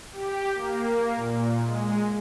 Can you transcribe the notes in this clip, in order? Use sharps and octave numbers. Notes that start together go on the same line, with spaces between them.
G4
A#3
A#2
G#3